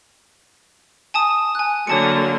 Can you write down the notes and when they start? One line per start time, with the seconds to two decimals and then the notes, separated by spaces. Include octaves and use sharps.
1.14 G#5 A5 D#6
1.55 G#5 F#6
1.87 D3 F#3 A#3 C#5 A5 C#7